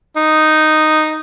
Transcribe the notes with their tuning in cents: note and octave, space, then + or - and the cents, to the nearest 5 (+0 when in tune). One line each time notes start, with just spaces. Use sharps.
D#4 -5